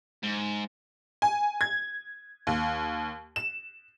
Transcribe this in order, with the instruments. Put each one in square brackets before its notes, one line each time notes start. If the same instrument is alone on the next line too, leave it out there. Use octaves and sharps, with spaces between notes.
[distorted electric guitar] G#2
[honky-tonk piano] G#5
G#6
D#2
E7